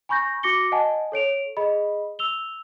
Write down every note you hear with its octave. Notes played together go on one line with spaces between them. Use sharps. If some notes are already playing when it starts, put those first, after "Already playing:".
G#5 B5 C#6 G6 A#6
F#4 D6 A#6 C#7 G7
D#5 F#5 G#5 A5
A4 C#5 D7 F7
G#4 D#5 B5
E6 F7 G7